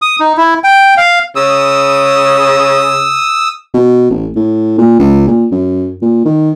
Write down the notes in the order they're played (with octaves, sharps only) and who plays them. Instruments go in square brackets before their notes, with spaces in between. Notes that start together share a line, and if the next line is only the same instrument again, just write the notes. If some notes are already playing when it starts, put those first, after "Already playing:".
[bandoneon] D#6
D#4
E4
G5
F5
[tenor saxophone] C#3 [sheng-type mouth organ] D#6 E6
[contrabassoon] B2
A1
A2
A#2
C#2
A#2
F#2
A#2
D#3